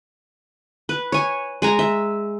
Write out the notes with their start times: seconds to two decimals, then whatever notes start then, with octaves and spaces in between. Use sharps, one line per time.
0.89 B4
1.12 C#5 G#5
1.62 G#3 G#5 A#5
1.79 E5